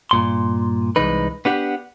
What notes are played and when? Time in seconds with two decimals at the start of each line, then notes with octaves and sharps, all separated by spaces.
0.11 G2 A#2 C6
0.96 C2 E3 G#3 D#4 B4
1.45 B3 D4 G4 F#5